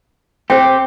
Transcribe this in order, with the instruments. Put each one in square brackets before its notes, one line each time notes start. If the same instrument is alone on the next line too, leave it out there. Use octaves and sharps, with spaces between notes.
[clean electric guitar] C4 G4 [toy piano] C5 G5